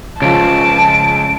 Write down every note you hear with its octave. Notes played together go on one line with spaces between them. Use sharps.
C#2 C#3 F3 A5 D7